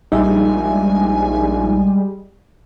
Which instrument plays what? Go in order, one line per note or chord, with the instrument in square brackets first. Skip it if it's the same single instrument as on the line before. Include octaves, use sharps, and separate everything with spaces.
[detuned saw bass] A#1 [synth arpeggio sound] G3 G#3 [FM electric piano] D#4 E5 [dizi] G#5